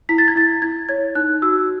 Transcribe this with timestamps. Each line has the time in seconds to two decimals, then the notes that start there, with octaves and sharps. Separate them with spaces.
0.09 E4 B6
0.18 A6
0.28 G#6
0.35 E4 A6
0.62 E4 G#6
0.89 C#5 G#6
1.15 D#4 F#6
1.42 F#4 E6